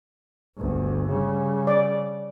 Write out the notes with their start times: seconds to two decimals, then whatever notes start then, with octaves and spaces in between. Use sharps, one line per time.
0.56 G1 D2
1.09 C#3 G3
1.67 D5